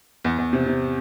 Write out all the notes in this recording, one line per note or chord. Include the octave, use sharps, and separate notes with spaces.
E2
E2
C3
C3